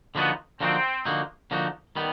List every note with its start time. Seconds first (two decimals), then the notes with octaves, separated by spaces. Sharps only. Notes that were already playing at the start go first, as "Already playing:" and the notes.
0.15 D3 F3 A#3 B3 D#4 F#4
0.60 D3 F3 A#3 C4 D#4 F#4
1.05 D3 F3 A#3 D#4 F#4
1.51 D3 F3 A#3 D#4 F#4
1.96 D#3 G3 B3